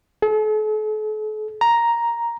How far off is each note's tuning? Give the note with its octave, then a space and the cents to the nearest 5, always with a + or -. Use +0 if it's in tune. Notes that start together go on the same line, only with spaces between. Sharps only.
A4 -45
A#5 +5